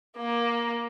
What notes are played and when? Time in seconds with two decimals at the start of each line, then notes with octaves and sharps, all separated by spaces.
0.18 A#3